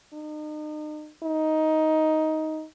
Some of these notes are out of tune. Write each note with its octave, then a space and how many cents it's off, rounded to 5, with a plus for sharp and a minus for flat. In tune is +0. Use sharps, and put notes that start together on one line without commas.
D#4 -40
D#4 +10